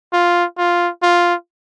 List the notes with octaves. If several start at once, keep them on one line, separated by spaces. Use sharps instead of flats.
F4
F4
F4